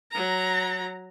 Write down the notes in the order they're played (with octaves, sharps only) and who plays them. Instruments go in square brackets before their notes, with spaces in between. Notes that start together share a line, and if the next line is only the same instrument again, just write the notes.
[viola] F#3 A#5